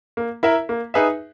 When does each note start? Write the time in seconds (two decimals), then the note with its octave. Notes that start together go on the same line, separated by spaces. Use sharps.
0.17 A#3
0.43 E4 A#4 E5
0.69 A#3
0.94 D#4 G#4 B4 E5